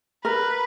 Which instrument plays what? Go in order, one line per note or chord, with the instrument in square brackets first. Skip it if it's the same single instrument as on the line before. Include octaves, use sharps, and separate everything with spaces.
[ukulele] A#4 [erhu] B4